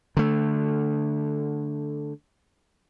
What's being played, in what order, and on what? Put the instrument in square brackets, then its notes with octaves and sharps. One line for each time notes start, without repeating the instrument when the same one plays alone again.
[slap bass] D3 A3